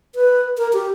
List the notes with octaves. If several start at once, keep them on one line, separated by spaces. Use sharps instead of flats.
B4
A#4
G4